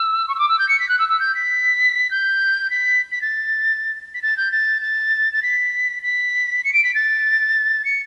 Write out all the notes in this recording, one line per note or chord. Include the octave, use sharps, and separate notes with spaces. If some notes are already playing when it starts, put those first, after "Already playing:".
Already playing: E6
C#6
E6
D6
E6
G6
C#7
B6
F#6
E6
E6
G6
B6
G6
B6
B6
A6
B6
A6
G6
A6
A6
A6
B6
B6
C#7
D7
B6
A6
C#7